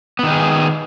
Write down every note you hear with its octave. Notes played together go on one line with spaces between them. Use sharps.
D#3 B3 D#4 G#4